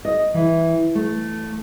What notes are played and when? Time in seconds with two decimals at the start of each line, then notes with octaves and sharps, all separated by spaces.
0.05 D#5
0.34 E3
0.95 A3